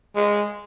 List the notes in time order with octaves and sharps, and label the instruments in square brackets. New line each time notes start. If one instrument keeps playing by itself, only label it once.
[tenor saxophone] G#3